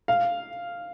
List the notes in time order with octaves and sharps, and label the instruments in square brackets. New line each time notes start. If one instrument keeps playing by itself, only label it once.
[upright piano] F5